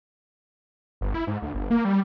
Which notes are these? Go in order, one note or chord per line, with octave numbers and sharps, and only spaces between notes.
G1
E4
G#2
D2
G1
A#3
G3